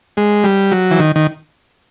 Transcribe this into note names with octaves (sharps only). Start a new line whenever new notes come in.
G#3
G3
F#3
E3
D#3
D#3